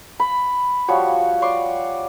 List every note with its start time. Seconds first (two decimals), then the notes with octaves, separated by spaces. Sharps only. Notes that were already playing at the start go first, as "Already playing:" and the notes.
0.19 B5
0.88 F3 G3 F#4 C#5
1.42 C#5 D5 C6 C#6